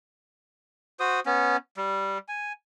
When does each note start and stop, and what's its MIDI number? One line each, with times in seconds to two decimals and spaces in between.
1.00 1.20 66
1.00 1.20 72
1.00 1.20 87
1.26 1.57 59
1.26 1.57 61
1.77 2.18 55
2.28 2.53 80